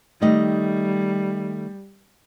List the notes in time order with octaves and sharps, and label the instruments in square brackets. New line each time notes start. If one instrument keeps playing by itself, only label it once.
[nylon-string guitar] D#3 A3 D#5 [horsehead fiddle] G3